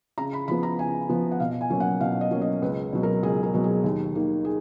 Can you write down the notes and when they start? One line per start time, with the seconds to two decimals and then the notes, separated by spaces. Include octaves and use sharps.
0.18 C#3 A#5
0.33 B5
0.48 F3 B3 B5
0.63 A#5
0.79 C#3 G#5
1.09 F3 B3
1.31 F#5
1.40 B2 F5
1.61 G#5
1.70 F#3 A#3 C#4
1.80 F#5
2.00 B2 F5
2.21 D#5
2.31 F#3 A#3 C#4
2.42 D#5
2.62 C#2 B4
2.93 B2 F#3
3.03 A#4
3.23 C#2 G#4
3.43 A#4
3.54 B2 F#3
3.64 G#4
3.84 D#2
4.15 D#3 A#3
4.45 G#4